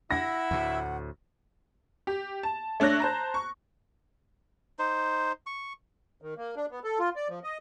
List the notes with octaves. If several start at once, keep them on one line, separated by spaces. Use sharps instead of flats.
E4 E5 F#5 A#6
D2 A2
G4
A5
A3 D4 C#5 F#6 A#6
C5 A5 A#5
C#6
D#4 C5
C#6
D#3
A#3
D4
B3
A4
F4
D5
F3
D#5